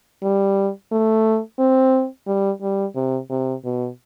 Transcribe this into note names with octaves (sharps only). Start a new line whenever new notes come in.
G3
A3
C4
G3
G3
C3
C3
B2